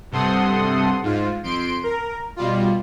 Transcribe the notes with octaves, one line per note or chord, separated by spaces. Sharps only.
G2 C3 A4 F#5 C6 D#6
G#2 F4
F2 C6 D7
A#4
B2 G3 F4